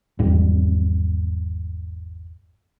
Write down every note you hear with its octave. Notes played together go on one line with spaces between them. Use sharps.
G#1 E2 G#2 G3